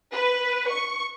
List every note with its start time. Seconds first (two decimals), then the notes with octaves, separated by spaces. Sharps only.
0.12 B4
0.70 C#6